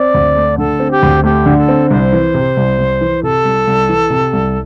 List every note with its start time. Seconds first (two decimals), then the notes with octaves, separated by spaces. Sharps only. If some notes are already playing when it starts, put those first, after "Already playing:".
Already playing: C4 D5
0.14 D2
0.36 A3
0.58 D3 A4
0.80 C4
0.91 G4
1.03 D2
1.24 A3 G4
1.46 D3
1.57 A4
1.69 C4
1.90 C2 C5
2.13 E3
2.34 C3
2.57 C2
2.78 C2
3.01 E3
3.23 C3 A4
3.45 C2
3.67 C2
3.89 E3
4.10 C3
4.33 C2